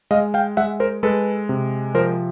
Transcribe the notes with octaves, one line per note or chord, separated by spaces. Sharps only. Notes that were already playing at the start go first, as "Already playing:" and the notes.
G#3 D#5 F5
F5 G5
G#3 E5 F#5
A#4 C5
G#3 A4 B4
C3
F3 A#4 C5